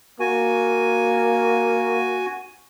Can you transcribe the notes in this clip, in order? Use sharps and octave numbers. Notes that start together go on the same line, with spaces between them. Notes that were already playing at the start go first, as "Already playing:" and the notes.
A#3 F#4 G#5